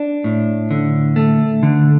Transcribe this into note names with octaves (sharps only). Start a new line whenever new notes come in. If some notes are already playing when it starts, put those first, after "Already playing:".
Already playing: D4
A2
D3
A3
D3